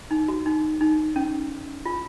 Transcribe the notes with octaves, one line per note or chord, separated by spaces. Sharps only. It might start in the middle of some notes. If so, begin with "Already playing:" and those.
D#4
F#4
D#4
D#4
C#4
F4